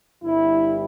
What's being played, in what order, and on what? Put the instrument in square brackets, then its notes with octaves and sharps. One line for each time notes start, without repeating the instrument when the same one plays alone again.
[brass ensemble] G1 G2 G3 E4